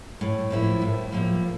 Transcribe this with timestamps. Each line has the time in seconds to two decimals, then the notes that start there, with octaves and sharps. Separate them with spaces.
0.21 A2
0.50 F3 A#3 E4
0.82 A2
1.12 F3 A#3 E4